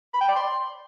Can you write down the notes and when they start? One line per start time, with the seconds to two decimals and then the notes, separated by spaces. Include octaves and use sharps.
0.13 B5
0.21 G5
0.28 D5
0.36 C6